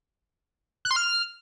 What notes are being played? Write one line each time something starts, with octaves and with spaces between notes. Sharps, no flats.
F#6
C6
F6